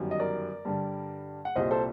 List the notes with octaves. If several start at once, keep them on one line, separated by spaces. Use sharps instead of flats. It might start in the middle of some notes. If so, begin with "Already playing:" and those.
Already playing: G1 F#2 D#3 G3
D#5
A#4 D5
G2 D3 G3
F#5
C2 A#2 G3 C5 D#5
A4 C5